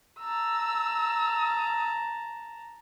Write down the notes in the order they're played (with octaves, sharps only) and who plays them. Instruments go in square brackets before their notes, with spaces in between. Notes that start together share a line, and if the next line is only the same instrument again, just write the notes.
[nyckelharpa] A5 A#5 [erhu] E6